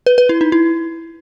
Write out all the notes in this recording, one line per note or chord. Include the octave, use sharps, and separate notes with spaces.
B4
B4
E4
D#4
E4